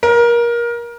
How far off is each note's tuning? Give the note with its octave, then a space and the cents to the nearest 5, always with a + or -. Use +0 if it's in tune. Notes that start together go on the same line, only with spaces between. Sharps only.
A#4 +25